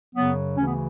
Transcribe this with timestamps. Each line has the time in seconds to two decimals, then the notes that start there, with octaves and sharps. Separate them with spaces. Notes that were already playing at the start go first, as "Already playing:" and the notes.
0.15 F#2 C#3 F#3 B3
0.57 D2 C#3 E3 C#4
0.66 B3